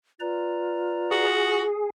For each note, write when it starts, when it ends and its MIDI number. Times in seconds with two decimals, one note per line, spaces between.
0.20 1.64 65
0.20 1.26 71
0.20 1.26 74
0.20 1.26 82
1.11 1.63 66
1.11 1.90 68